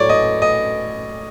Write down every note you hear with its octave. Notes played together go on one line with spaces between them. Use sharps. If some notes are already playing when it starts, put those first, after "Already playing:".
Already playing: A2 F#3 A3 C#5 D5
D#5
D#5